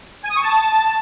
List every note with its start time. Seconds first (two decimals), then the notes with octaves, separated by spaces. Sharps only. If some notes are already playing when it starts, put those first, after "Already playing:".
0.24 G#5
0.30 D#6
0.37 C#6
0.43 A5